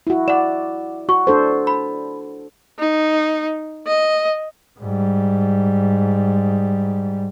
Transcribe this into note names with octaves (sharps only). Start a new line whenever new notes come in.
E4 F#4
D5 F#5 E7
F#4 C#6
D4 A4 C5
B5
D#4
D#5
G#2 G3